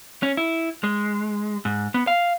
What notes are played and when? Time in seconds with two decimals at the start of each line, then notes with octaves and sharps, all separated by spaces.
0.23 C#4
0.37 E4
0.84 G#3
1.65 G#2
1.94 B3
2.07 F5